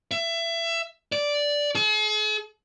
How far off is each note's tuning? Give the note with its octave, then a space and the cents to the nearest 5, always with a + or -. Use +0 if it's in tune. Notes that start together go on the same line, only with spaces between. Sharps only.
E5 +25
D5 -5
G#4 +45